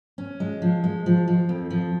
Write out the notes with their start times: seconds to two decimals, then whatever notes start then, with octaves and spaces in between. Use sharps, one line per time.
0.18 C#4
0.40 G#3
0.62 F3
0.84 G#3
1.06 F3
1.28 F3
1.49 F2
1.70 F3